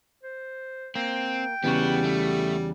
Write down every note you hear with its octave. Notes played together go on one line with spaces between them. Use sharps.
C5
A#3 C4 G5
E2 C#3 G3 B3 F#4
A3